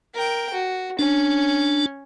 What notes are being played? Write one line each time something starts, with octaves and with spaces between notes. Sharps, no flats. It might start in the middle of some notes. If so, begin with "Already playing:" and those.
A#4 G5
F#4
C#4 D4